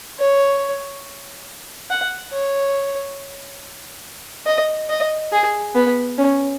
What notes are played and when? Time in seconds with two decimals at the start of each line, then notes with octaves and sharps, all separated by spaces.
0.19 C#5
1.90 F#5
2.33 C#5
4.46 D#5
4.90 D#5
5.32 G#4
5.75 B3
6.18 C#4